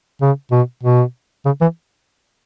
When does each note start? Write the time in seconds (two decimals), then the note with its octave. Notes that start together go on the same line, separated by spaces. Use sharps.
0.21 C#3
0.52 B2
0.83 B2
1.46 C#3
1.61 E3